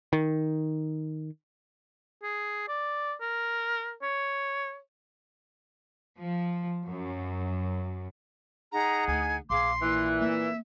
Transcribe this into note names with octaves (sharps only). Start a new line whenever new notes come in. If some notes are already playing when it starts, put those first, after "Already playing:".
D#3
G#4
D5
A#4
C#5
F3
F#2
D#4 G#4 F#5 A#5
D2 G#5
A#1 G#4 F5 C6 D6
A#2 E3 F#6
A#3 C4 E5